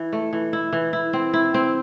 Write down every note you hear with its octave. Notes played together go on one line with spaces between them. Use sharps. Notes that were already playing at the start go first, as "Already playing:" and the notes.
Already playing: E3 E4
A3
E3
E4
E3
E4
C4
E4
C4